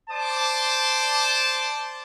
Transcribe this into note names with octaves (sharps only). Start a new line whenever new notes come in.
C5 D5 A5 D6